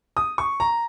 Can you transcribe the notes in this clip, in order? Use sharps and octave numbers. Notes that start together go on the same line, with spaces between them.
D#6
C#6
A#5